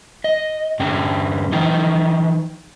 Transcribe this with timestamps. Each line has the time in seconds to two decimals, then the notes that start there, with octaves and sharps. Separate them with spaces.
0.24 D#5
0.80 G2 D3 C#4 G5
1.52 E3 F3 D#4 D#5 G5